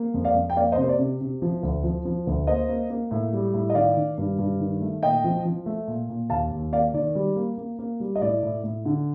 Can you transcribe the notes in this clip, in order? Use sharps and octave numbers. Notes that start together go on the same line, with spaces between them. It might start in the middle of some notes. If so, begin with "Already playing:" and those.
Already playing: A#3
F2
D5 F5
F2
G5
A#3 D5 F5
C5 D#5
C3
C5
D5
C3
C3
F3
D2
F3
F3
D2
A#3 C5 D#5
A#3
A#3
A2
G3
A2
D#5
D#3 D5 F5
D#3
G2
G2
D#3
A3
A#2 D#5 G5
F3
F3
A3
A#2
A#2
D#2 F5 A5
D#2
A#3 D5 F5
D#3 D5
G3
A#3
A#3
A#3
G3
D#5
A2 D5
A2
A2
D3